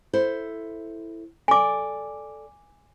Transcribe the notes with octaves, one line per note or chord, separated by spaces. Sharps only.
E4 A4 C5
A4 D5 G#5 D6